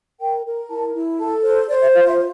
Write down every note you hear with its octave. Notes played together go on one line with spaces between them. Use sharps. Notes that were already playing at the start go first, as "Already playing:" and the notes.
A#4 G5
A#4
E4 A5
E4
A4 A5
C5
C5 D5
E5
F4 F5
E5